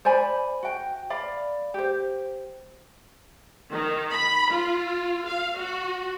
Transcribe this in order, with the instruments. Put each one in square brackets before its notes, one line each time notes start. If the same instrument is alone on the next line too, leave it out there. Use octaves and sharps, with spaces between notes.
[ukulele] C5 D5 G#5 B5
F#4 G5
D5 F5 B5
G4 C5
[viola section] D#3
B5
F4
F5
F#4